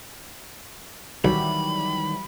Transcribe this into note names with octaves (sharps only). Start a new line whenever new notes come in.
B1 D#3 E3 F#3 G3 B5